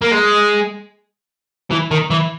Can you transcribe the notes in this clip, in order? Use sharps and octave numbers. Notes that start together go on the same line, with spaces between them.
A#3
G#3
E3
D#3
E3